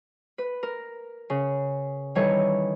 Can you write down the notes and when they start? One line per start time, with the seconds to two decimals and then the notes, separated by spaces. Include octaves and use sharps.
0.38 B4
0.63 A#4
1.30 C#3
2.15 D#3 E3 G3 D#4 A4 C#5